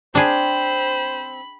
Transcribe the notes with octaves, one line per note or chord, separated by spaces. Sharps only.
C4 D4 G#4 C5 B5